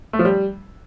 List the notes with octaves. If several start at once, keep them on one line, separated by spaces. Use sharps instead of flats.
A3
F3
G3